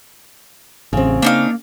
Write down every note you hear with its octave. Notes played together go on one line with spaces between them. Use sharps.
A1 C#3 C4
A#3 D4 D#4 F5